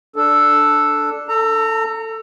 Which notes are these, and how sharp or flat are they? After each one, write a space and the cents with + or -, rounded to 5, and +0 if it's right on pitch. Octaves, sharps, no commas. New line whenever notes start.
D4 +0 A4 +0
A4 +15 A#5 -25